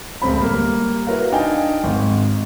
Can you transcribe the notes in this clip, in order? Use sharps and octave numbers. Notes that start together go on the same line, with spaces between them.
D1 C#2 C#3 C4 B5
G3 A#3
E4 F#4 A#4 B4 F5
D4 D#4 F5 G5 G#5
G#1 G#2